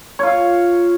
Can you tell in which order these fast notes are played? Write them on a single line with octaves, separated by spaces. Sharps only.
C#5 F4 F5